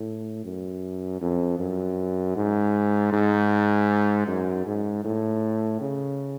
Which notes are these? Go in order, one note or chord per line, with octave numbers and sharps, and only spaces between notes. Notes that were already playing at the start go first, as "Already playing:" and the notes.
Already playing: A2
F#2
F2
F#2
G#2
G#2
F#2
G#2
A2
C#3